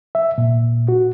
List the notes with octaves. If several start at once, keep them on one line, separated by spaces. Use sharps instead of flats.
E5
A#2
F#4